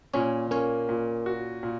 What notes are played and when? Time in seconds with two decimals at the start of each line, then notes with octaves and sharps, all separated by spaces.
0.14 A#2 C#4 C#5
0.51 A#3 C#4 C#5
0.89 A#2
1.26 F#4
1.63 A#2